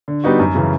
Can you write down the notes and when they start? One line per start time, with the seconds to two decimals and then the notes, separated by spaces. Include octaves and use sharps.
0.08 D3
0.24 G3 B3 D#4 F#4
0.39 F#2
0.55 C#3 E3